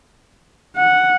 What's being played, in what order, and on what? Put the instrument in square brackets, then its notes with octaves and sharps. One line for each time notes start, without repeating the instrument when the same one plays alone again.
[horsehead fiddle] F#5